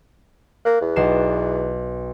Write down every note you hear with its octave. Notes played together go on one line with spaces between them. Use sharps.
A#3 F#6
E2
B1 C7 E7